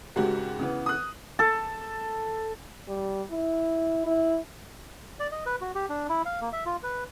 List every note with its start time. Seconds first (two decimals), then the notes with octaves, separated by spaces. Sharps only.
0.16 G#1 G#2 C#3 F#4 G4
0.59 C#3 E3 B3
0.86 D#6 F#6
1.39 A4
2.88 G3
3.31 E4
4.06 E4
5.20 D5
5.32 D#5
5.46 B4
5.61 F#4
5.75 G4
5.89 D4
6.09 E4
6.25 F5
6.41 A#3
6.53 E5
6.66 F4
6.83 B4